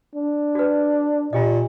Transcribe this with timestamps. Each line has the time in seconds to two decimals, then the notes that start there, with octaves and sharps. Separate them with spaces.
0.15 D4
0.55 F#4 B4
1.33 A#2 F4 G4 D#5